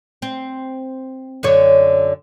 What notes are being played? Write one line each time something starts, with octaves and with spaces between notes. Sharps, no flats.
C4
F#2 D3 C#5